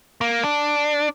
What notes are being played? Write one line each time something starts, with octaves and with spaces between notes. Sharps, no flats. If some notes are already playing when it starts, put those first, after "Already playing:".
A#3
D4